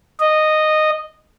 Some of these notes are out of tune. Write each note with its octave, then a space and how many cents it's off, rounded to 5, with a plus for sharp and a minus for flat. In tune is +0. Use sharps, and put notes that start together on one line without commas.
D#5 -10